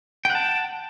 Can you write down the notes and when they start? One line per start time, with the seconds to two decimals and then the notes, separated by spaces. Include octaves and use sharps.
0.25 G5
0.30 F#5
0.35 A5